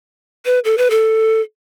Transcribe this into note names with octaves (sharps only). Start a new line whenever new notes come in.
B4
A4
B4
A4